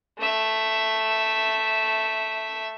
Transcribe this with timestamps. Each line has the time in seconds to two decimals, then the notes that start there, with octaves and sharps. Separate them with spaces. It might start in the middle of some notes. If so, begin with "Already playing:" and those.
0.19 A3 E5